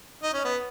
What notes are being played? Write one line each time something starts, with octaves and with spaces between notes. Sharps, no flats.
D#4
C#4
B3